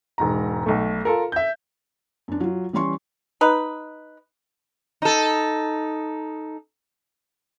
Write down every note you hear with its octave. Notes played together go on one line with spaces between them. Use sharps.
E1 G#2 A#5
B1 A3
F4 A4 A#4
E5 G6
F#2 D4
F#3 F4
E3 G3 C#4 C6 C#6
D#4 B4
D#4 A4